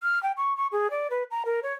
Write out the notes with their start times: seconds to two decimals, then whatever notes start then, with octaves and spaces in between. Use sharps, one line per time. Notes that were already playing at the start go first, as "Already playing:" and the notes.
0.03 F6
0.23 G5
0.37 C#6
0.57 C#6
0.72 G#4
0.91 D5
1.10 B4
1.31 A#5
1.45 A#4
1.63 C#5